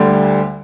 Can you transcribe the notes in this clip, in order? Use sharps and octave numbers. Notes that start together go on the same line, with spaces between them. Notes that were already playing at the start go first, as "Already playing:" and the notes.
Already playing: D2 D3 G3